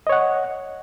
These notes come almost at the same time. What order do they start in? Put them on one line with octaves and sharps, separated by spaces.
D#5 C#5 F#5